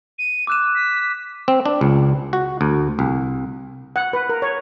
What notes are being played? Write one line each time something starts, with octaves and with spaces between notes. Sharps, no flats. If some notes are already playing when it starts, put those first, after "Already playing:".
D#7
D6 E6 F#6 E7
B6
C4
D4
C#2
F#4
D2
C2
F#5
B4
A#4
C#5